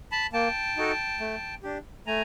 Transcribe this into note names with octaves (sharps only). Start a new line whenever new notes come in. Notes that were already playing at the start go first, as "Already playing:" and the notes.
A5 B5
A#3 G5 A5
D#4 F#4 A4
A3
D4 G4
A3 G#5 A#5